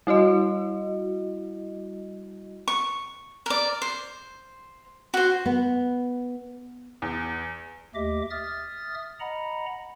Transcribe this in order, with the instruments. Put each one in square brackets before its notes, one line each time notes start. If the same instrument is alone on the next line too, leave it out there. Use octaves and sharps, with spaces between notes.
[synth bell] G3 E4 F#4 D#5
[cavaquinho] C#6
A#4 D5
C5
F#4 C5
[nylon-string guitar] B3
[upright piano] E2
[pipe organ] D#2 A3 G4 D#5 E5 D6
E5 D#6 F6 A6
D#5 F#5 A#5 B5